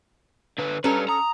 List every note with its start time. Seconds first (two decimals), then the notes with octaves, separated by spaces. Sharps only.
0.58 D3 B4
0.84 G3 C#4 A4 B4 A#5
1.09 A#5 D#6